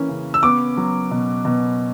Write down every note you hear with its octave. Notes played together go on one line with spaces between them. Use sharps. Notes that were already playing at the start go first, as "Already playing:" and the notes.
Already playing: E3 A#3 C#4
C#3
E6
B3 D6
F#3
B2
B2